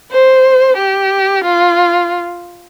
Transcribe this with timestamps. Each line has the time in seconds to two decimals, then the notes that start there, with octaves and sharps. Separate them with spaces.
0.10 C5
0.77 G4
1.44 F4